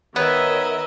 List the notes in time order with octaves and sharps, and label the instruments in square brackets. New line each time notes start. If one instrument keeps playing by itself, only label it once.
[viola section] D#3 A#4 E5 [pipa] B3 [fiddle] B4 D#5 [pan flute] C#5